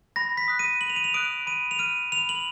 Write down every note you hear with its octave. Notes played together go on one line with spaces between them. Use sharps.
B5 A#6
B6
D#6 F#6
D#7
B5 F#7
F7
D#7
F7
D#6 F#6 D7
B5 D#7
F7
F6 D#7
B5 F7
F#7